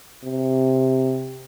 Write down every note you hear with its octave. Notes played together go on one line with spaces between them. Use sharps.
C3